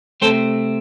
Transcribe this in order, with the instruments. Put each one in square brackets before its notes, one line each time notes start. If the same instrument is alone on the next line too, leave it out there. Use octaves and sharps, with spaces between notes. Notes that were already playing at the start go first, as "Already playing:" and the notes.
[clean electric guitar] C3 F3 A3 C4 A4 C5